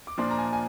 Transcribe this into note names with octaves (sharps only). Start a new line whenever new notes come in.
D6
A#2 F3 A#3 D4 C6
A#5
G#5
G#5